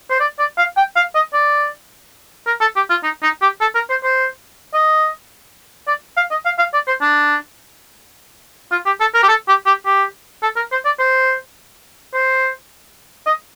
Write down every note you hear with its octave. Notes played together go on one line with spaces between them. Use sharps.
C5
D5
D5
F5
G5
F5
D#5
D5
A#4
A4
G4
F4
D#4
D#4
G4
A4
A#4
C5
C5
D#5
D5
F5
D#5
F5
F5
D5
C5
D4
F4
G4
A4
A#4
G4
A4
G4
G4
G4
A4
A#4
C5
D5
C5
C5
D#5